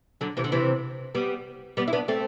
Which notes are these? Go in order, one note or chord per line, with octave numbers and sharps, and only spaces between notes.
D3 F#3
C3 E3
D3
C3 E3
G3 B3
G3 B3
E4
B3 D4
A3 C4